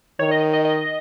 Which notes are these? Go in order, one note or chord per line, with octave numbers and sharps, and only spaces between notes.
D#3 C#5
D#5
D#5
D#5